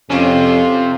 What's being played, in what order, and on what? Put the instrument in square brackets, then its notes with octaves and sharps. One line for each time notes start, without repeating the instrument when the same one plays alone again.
[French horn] F2 [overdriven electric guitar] C3 [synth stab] C#4 [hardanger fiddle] F4